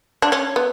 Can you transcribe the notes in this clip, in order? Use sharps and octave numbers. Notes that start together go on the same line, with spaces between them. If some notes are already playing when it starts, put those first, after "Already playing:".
D4
C#4
B3